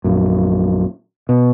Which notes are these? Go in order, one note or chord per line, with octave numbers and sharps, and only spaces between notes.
A#1 F#2
B2